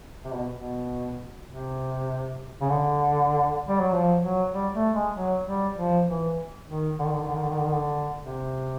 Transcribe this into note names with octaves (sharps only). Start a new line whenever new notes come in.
C3
B2
B2
C3
C#3
D3
G3
F#3
F3
F#3
G3
A3
G#3
F#3
G3
F3
E3
D#3
D3
D#3
D3
D#3
D3
D#3
D3
D#3
D3
D#3
D3
C3